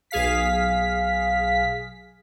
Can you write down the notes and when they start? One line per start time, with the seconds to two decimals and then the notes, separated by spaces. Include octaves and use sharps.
0.11 B1 G#4 F5 B6